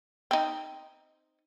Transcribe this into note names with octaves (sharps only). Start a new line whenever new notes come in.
C4 D#4